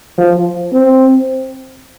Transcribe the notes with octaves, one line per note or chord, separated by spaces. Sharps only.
F3
C4